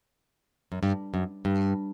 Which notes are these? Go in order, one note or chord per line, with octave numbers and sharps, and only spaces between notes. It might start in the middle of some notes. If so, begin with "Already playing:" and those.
F#2
G2
F#2
G2